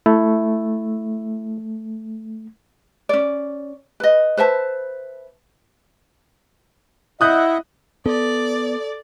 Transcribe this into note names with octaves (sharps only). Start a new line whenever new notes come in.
A3 E4
C#4 D5
B4 D#5
B4 C5 E5 A5
E4 D#5 E5 F#5 D#6 F#6 G6
B3 A4 D5